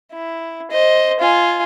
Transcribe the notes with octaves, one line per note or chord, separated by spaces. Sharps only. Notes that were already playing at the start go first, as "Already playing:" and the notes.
E4
C5 D#5
F4 G#5